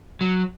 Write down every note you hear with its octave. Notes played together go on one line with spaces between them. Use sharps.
F#3